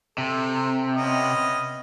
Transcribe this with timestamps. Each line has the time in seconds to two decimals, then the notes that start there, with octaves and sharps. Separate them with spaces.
0.18 C3 A4
0.96 B3 C#4 D#5